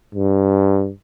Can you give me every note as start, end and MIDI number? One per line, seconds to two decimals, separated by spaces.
0.15 0.91 43